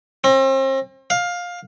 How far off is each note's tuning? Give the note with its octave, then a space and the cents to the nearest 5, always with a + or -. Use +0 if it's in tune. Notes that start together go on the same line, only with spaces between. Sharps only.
C4 +40
F5 +15